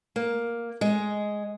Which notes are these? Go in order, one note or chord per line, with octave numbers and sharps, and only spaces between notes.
A#3
G#3